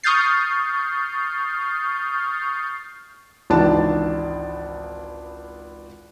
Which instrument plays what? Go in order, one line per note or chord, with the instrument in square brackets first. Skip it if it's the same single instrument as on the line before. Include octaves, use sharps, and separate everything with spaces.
[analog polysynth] C#6 D#6 F6 G6 A6 C7
[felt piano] G#1 C#2 E3 D4 D#4 A5